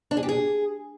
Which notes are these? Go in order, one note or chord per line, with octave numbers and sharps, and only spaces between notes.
D4
G#4
G4
G#4